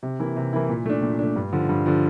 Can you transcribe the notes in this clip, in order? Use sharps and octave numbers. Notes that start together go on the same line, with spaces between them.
C3
E3 A#3 E4
C3
E3 A#3 E4
A#2
A3 D4
A#2
A3 D4
G2
D3 F3
G2
D3 F3